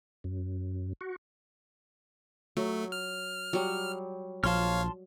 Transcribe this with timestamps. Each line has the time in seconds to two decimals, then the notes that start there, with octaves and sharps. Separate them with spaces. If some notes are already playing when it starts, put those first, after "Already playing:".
0.24 F#2
1.01 F#4
2.57 F#3 A3
2.92 F6
3.53 F#3 G3
4.44 A#1 F3 C#5 F5 A5 C6 F6